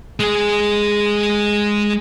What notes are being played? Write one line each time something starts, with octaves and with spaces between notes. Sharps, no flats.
G#3 G#4